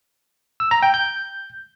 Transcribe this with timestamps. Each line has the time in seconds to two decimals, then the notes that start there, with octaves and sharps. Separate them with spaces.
0.60 E6
0.71 A#5
0.83 G5
0.94 G6